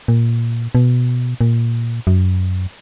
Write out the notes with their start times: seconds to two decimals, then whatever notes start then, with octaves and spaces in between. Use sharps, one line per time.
0.08 A#2
0.75 B2
1.41 A#2
2.07 F#2